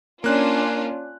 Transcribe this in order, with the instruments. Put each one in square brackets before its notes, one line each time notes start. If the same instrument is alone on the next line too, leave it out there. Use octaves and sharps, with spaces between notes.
[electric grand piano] A#3 F#6 [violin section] C#4 D4 F4